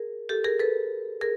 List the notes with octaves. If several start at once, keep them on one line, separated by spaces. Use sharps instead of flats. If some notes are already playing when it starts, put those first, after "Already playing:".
Already playing: G#4 A#4
G4 A4
G#4 A#4
A4 B4
G#4 A#4